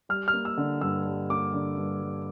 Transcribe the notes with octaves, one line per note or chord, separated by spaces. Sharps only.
G3 F6
F6
A#3
E6
D3
G2 E6
G3
A#3 D6
D3
G2
G3